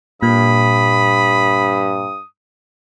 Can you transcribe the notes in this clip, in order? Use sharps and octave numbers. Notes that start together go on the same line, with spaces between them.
G2 A#2 B5 D#6